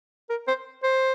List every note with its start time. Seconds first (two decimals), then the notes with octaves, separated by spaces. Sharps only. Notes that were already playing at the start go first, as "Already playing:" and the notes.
0.30 A#4
0.48 C5
0.83 C5